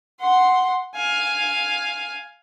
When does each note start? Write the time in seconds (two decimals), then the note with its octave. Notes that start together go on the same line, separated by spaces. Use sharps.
0.20 F#5 C6
0.95 F5 G#5